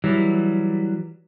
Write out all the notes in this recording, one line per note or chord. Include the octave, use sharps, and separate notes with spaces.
E3 F#3 G3